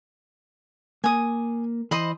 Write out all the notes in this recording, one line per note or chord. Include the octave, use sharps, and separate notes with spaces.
A#3 G#5 D#6
E3 C5 D#5 B5